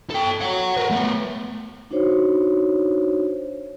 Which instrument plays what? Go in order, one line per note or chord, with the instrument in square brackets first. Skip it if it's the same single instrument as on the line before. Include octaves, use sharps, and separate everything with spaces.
[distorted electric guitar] A4 G5
C#5 F#5
A#4 B4
A3 B3
[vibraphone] D4 D#4 F#4 C5 C#5